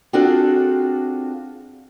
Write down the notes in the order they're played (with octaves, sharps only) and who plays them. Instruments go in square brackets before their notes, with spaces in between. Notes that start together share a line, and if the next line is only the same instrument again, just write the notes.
[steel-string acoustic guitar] C4 D4 F4 F#4 G#4 A4